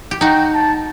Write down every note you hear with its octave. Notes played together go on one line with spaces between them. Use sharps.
G4
D#4 F#4 G5
A5